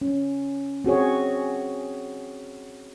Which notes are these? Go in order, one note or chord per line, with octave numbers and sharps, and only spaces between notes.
C#4
C4 F#4 G#4 C#5